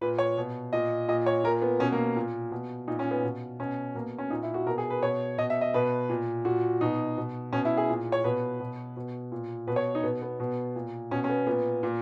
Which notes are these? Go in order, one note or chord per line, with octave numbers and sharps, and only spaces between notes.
A#2 B4
C#5
B2
A#2 D#5
A#2 D#5
C#5
A#2 A#4
B3
B2 C#4
A#3
A#2
B2
A#2 D#4
C#4
B3
B2
B2 C#4
B2 A#3
C#4
A#2 D#4
E4
F#4
B2 A#4
G#4
B4
B2 C#5
B2 D#5
E5
D#5
B2 B4
A#2
A#2 F#4
B2 D#4
B2
B2 C#4
E4
G#4
A#2
C#5
B2 B4
B2
B2
A#2
B2 B4
C#5
D#4
B2 B3
B3
B2
A#2
B2 C#4
C#4
B3
A#2 B3
A#2